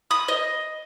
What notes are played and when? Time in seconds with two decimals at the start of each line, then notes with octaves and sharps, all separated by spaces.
0.11 B5 D#6
0.28 D#5